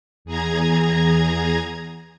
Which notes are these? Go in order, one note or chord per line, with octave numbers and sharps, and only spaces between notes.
E2 G#4 A#5 G#6